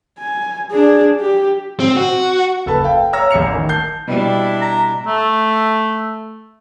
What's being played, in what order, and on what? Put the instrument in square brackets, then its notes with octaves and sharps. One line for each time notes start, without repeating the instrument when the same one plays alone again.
[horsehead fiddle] G#5
D4 G#4
G4
[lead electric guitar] C4
F#4
[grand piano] F#1 A4 B4 A5
F5 G5
C#5 A#5 E6 F6 A#6
A1 E2 E5 C#7 F7
D#3
A5 G6 C7
[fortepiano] B2 G3 [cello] D4 E4
[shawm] A#5
[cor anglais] A3